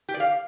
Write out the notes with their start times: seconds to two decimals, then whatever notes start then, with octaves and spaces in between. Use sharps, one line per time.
0.09 G4
0.14 D5
0.20 F5